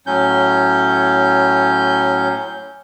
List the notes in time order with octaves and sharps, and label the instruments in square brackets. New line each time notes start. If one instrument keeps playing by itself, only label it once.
[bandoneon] A2 F#3 C#4 G6